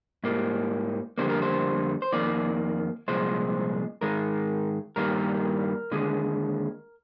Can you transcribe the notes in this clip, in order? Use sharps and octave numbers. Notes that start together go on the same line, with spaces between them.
G#2 G3 A#3
F2 D3 G3 A#3 C5
A#4
C5
C5
F2 D#3 A#3 D5
C2 A#2 F3 G#3 C5
G#2 D#3 G#3 A#4
G2 D#3 G3 A#3 A#4
D#2 D3 G#3